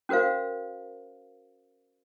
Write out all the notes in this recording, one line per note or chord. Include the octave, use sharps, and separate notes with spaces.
C#4 F#4 A#4 C5 F5